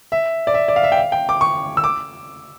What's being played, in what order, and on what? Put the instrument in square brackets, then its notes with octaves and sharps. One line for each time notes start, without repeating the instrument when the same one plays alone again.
[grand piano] E5
D5
E5
D5
F5
E5
G5
F5
G5
D6
C#6
E6
D6